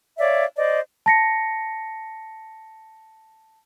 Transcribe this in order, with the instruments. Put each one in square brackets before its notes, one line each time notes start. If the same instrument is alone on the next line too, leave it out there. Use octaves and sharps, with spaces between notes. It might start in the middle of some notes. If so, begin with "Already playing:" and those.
[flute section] C#5 D5 E5 F5
C5 D5 D#5
[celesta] A5 A#6 C#7